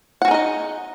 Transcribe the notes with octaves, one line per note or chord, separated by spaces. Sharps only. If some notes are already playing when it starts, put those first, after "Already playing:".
D#4 F#4 G#4 D#5 F#5